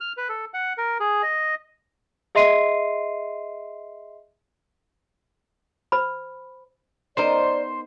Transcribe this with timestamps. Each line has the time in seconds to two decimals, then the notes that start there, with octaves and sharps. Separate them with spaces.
0.01 F6
0.17 B4
0.29 A4
0.54 F#5
0.78 A#4
1.00 G#4
1.22 D#5
2.35 G#4 D#5 E5 C6 C7 D#7
5.92 C5 B5
7.17 B3 D#4 A#4 C5 D5